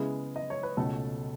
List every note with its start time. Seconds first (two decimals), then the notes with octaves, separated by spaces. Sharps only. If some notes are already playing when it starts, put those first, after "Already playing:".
Already playing: C#3 G#3 B3 E4 G#4
0.36 D#5
0.50 C#5
0.63 B4
0.77 C#2 B2 A3 C#4 A4